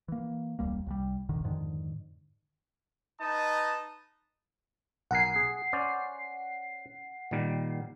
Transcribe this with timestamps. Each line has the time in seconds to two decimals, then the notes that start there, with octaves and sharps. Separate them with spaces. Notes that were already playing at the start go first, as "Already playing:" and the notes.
0.08 E3 A#3
0.59 E1 C#2 G3 A#3
0.86 C2 F#3 G3
1.29 E1 A#1 D3 D#3
1.44 F2 G#2 D3 D#3
3.21 D#4 B4 D#5 A5 D#6
5.11 B1 A#4 F#5 G#5 C7
5.36 G#4
5.73 C#4 C5 D5
7.31 A#2 D#3 G3